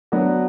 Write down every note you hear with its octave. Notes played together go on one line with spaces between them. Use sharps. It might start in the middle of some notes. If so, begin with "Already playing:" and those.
F#3 B3 D4 F#4